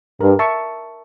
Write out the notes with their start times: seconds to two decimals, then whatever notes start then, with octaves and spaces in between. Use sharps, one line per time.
0.21 G2 A#4
0.39 E5 A5 C#6